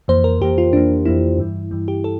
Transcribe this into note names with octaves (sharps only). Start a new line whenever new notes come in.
F2 E3 A#3 C5
A#4
F2 E3 A#3 G4
F4
F2 E3 A#3 D4
F2 E3 A#3 E4
G2 E3 G3
G2 E3 G3
G4
A4